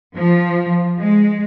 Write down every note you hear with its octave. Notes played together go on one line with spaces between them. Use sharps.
F3
G#3